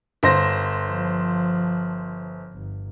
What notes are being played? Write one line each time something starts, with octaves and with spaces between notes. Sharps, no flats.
G1 C5 A#6
F3
G1